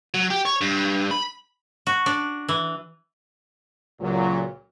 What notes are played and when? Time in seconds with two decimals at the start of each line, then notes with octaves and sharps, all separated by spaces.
0.14 F#3
0.30 G4
0.45 C#5
0.61 G2
1.11 B5
1.87 F#4
2.06 D4
2.49 E3
4.00 C#2 A#2 F#3